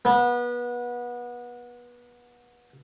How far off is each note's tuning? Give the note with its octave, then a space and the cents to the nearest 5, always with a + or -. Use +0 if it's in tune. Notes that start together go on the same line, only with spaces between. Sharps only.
B3 -25